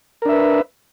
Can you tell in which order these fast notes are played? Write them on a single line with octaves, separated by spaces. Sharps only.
A#4 D4 E5 B4